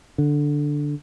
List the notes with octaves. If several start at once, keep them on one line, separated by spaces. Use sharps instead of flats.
D3